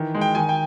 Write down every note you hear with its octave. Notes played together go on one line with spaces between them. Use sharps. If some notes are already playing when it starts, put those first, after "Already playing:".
Already playing: D#3 E3
G#3
G5
D#3 G#5
G5